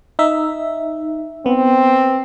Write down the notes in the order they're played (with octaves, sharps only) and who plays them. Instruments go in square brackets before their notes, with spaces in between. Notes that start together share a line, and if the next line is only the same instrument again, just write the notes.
[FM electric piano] D#4 E5
[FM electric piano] B3 [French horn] C4